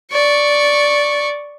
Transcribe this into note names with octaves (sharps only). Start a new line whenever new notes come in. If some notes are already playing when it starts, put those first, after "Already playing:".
D5 C#6